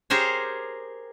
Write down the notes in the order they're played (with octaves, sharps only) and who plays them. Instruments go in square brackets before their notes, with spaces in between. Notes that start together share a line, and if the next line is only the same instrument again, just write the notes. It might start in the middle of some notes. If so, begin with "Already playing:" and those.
[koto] G4 G#4 A#4 C5 C#5